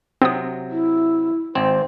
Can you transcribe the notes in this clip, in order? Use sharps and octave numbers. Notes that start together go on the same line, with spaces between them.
C3 F#3 C4 D#6
E4
G#1 C4 C5